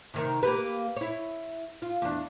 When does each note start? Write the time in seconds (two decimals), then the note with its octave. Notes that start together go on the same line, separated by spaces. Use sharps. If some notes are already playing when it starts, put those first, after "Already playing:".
0.14 C3 D#3 A#4
0.43 A#3 G4 B4
0.96 E4 C#5
1.82 F4
2.02 E2 D4